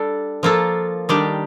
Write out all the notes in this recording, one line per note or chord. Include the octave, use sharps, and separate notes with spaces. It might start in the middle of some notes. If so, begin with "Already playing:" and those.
Already playing: G3 D4 A4
F3 A#3 F4 A4
D#3 G3 D4 G4